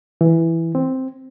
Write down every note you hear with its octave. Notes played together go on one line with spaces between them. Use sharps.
E3
C4